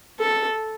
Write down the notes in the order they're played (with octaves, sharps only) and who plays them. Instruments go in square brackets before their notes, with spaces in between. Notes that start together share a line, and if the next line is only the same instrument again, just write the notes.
[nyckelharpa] A4